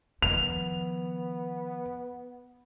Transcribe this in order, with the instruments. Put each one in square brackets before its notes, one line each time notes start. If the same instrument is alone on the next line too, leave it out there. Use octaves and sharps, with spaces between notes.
[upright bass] D#3 F3 [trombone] B3 [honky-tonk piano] F7